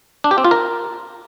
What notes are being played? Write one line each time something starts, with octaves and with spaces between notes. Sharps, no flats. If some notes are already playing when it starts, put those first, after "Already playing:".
D4
G4
C4
F4
A#4